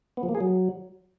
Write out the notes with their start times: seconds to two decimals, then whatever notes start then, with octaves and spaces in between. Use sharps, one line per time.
0.17 B3
0.23 F3
0.29 A#3
0.35 G#4
0.40 F#3